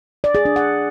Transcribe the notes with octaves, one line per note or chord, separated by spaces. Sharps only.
D5
G#4
D4
F#5